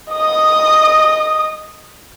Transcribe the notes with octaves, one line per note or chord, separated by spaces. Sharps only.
D#5 D#6